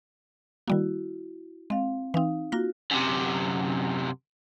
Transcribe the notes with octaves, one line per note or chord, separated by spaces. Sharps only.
D#3 G3 A#3 E4 F#4
G#3 C4 F5
E3 C4 D#4 F5
A#3 F4 F#4 A#6
F#2 C3